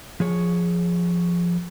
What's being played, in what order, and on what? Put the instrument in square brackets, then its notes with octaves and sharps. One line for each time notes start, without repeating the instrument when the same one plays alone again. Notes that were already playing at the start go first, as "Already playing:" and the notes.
[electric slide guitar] F3 G#4 C#5